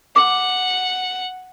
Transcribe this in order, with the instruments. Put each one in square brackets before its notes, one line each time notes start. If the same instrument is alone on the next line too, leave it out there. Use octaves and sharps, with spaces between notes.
[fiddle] F#5 [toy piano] D6